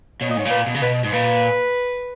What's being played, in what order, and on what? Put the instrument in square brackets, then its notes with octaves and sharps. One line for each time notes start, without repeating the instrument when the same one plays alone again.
[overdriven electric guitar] B2 [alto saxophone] C#5
[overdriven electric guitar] A#2 [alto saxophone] D#5
[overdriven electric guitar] G#2 [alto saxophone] C#5
[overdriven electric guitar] A#2
[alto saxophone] B4
[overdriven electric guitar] B2
C#3
[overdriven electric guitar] B2 [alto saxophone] B4
[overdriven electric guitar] G#2
[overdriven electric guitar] A#2 [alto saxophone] B4